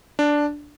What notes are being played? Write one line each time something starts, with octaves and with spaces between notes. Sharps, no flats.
D4